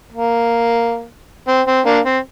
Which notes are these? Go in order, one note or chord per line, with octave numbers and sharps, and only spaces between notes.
A#3
C4
C4
A#3 D4
C4